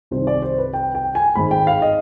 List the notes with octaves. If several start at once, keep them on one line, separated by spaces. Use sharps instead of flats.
C2 C3 D#3 C5
D5
C5
B4
G5
G5
G#5
G#1 G#2 D#3 B5
G5
F5
D#5